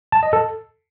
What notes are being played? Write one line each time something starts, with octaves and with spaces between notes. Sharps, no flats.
A5
D#5
A4